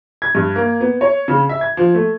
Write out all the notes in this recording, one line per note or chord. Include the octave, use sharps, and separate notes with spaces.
G#6
G2
A#3
B3
C#5
C#3
E5
G#6
F3
A3